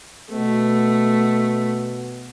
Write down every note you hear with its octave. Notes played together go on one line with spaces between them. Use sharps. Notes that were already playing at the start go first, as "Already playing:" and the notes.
B2 A3